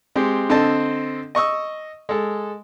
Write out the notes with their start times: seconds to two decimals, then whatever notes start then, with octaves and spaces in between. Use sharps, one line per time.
0.16 G#3 C4 G4
0.49 D3 C4 A4 D#5 A5
1.35 D#5 C#6 D#6 E6
2.09 G#3 A4